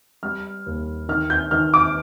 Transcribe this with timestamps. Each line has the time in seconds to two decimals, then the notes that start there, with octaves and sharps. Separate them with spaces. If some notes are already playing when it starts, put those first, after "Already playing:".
0.23 G3 F6
0.66 D#2
1.09 D#3 F6
1.30 G6
1.51 D#3 F6
1.74 D6